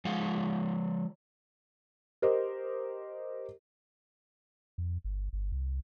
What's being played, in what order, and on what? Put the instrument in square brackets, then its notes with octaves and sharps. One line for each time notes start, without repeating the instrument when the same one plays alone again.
[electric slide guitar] F3 G#3 F4 F5 F#5
[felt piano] G4 A#4 C5 D#5
[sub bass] F2
G1
G1
C2